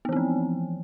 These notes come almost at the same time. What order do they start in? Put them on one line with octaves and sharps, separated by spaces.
B3 E3 C4 F3